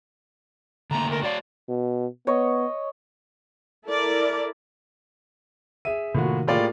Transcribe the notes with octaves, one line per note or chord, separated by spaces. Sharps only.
D3 A3 A#3 A#5
A#4
F#4 C#5 D5 F5
B2
B3 C#5 D#5
E4 A4 A#4 D5
G#4 E5 D#7
A2 C3 D#3 A#3 F4 F#4
A2 A#3 F4 G4 G#4 D5